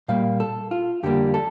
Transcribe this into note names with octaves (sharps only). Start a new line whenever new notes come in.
A#2 G3 A#3 F5
A4
F4
F2 D3 G3 A#3 G4
A4